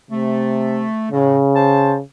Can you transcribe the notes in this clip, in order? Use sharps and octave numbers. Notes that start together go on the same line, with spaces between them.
C3 A3
A2 C#3
C5 A5